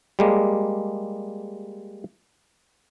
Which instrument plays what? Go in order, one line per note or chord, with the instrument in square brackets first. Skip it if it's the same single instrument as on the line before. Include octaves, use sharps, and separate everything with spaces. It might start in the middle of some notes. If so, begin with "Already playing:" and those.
[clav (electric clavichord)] G3 G#3 A#3